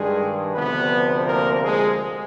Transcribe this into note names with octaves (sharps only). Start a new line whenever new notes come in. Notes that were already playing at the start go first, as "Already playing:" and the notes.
Already playing: G2 D#3 G3 G#3 G#4
D2 C3 F3 B3 B4
A#3 A#4
G#3 G#4